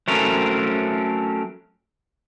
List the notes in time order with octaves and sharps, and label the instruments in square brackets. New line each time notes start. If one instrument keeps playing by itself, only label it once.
[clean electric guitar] F#3 A3 C4 C#4 A#4